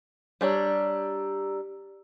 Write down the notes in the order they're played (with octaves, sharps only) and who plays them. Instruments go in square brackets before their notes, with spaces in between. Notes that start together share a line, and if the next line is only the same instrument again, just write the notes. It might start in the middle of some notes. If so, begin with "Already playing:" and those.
[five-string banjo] G3 D4 C#5 [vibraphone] G4 A#5 E6